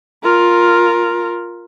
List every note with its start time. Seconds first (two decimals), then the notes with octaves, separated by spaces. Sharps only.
0.24 F4 A#4